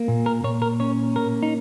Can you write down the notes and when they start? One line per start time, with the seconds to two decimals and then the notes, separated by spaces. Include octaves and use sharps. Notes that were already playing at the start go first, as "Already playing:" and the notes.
Already playing: A#3
0.08 A#2
0.26 A#4
0.44 A#2 C#5
0.62 A#4
0.80 C#4 C#5
1.16 A#3 A#4
1.43 D#4